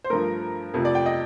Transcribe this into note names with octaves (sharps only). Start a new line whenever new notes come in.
C5
G2 F3 A3 A#4
F2 C3 F3 A3
D5
G5
D#5